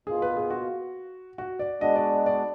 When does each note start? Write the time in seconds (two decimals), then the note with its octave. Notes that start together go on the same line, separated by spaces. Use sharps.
0.07 B2 A#3 F4 G#4
0.22 B4
0.37 G#4
0.50 F#4
1.38 F#4
1.59 D5
1.81 G#3 B3 D4 F#4 D#5
1.96 D5
2.12 D#5
2.26 D5